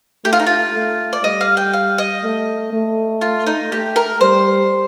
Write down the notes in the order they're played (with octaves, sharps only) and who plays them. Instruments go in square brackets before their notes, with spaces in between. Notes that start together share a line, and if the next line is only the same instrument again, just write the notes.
[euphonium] A3 [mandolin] G4
[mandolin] F4
D#4
F4
[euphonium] A3
[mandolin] D5
[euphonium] G3 [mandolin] D#5
[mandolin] F5
G5
F5
D#5
[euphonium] A3
A3
[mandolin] F4
D#4
[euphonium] A3 [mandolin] G4
[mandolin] A#4
[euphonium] G3 [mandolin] C5